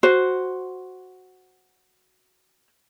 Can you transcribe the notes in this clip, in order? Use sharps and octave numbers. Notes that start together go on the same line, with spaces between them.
F#4 C5